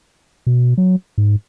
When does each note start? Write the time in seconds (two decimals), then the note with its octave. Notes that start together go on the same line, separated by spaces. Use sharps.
0.47 B2
0.78 F#3
1.18 G#2